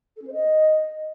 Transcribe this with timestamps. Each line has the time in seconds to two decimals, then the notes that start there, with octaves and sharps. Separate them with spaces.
0.16 A4
0.22 C#4
0.27 C5
0.33 D#5